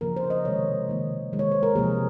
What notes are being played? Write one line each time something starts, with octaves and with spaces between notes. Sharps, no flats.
C#3 F3 A#3 A#4
C5
D#5
C3 D#3 G#3 C#5
C3 D#3 A#3
D#3 G#3
C#5
C5
A#4
C3 F3 A#3 G#4